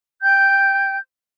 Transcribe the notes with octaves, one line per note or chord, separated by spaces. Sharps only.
G5 G6